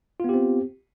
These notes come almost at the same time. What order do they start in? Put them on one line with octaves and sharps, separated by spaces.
F4 B3 G4 C4